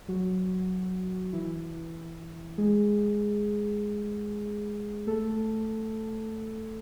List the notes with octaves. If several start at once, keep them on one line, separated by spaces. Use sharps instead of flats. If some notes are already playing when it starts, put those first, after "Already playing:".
F#3 F#4
E3 E4
G#3 G#4
A3 A4